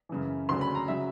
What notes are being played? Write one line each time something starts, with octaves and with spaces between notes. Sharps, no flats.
F#2 C#3 E3
D2 C#3 F#3 C6
B5
A#5
C#3 F#3 E5